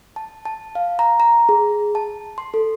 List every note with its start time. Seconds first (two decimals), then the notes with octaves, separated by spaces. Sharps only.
0.16 A5
0.45 A5
0.75 F5
0.99 A#5
1.20 A#5
1.49 G#4
1.95 A5
2.38 C6
2.54 A4